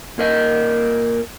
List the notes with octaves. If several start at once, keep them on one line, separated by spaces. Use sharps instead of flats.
A#2 A#4 D#5